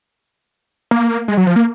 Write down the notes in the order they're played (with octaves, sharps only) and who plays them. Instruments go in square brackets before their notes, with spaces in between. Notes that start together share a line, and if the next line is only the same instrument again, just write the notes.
[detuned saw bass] A#3
G#3
F#3
F3
A#3